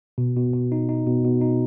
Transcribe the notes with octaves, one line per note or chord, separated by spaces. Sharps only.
B2
B2
B2
D#4
D#4
B2
B2
D#4